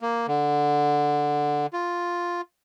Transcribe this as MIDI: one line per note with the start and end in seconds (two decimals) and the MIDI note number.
0.01 0.27 58
0.27 1.66 50
1.73 2.41 65